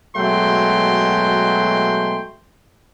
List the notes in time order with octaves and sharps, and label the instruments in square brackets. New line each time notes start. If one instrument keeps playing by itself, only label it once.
[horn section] B2 F#3 G#3 A3 G5 C6